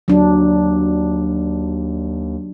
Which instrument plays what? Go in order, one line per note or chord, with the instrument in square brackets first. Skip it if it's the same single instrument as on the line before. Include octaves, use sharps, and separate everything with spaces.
[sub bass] D#2 [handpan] F#3 D4